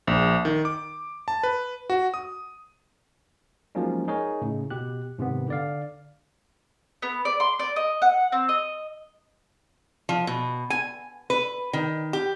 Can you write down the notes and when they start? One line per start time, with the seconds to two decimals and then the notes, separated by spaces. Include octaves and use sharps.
0.07 A#1
0.45 D#3
0.65 D6
1.28 A5
1.43 B4
1.90 F#4
2.14 D#6
3.75 F3 F#3 G#3 A#3 C#4 D#4
4.08 D#4 G#4 A#4 C#5
4.42 A2 C#3
4.70 B2 G4 F#6
5.18 G#2 C3 D#3 B3
5.48 D3 D5 F5
7.02 B3
7.25 D5
7.40 C6
7.59 D5
7.76 D#5
8.02 F#5
8.32 C4
8.49 D#5
10.09 F3
10.27 B2
10.70 G#5
11.30 B4
11.73 D#3
12.13 G4